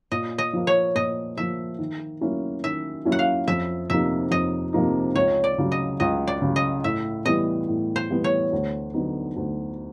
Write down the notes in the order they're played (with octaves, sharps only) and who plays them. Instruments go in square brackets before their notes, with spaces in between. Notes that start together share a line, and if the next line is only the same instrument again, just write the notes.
[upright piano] A#2 [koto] D#5
[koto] D#5
[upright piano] F3 A#3
[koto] C#5
[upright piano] A#2 [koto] D#5
[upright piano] F3 A#3 [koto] E5
[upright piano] D#3
F#3 A#3 C#4 E4
[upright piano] D#3 [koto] E5
[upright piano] F#3 A#3 C#4 E4
[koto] F#5
F5
[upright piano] F2 [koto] E5
[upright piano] C3 F3 A#3 D#4 [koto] E5
[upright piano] F2 [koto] D#5
[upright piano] C3 F3 A#3 D#4
[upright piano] C#2 [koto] C#5
[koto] D5
[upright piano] C#3 F#3
[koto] D#5
[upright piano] C#2 [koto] D#5
[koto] D5
[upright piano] C#3 F#3
[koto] D#5
[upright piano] A2 [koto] E5
[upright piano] E3 G3 B3 [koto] D#5
[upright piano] A2
[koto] C5
[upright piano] E3 G3 B3
[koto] C#5
[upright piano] D2
D3 F#3 B3 D#4
D2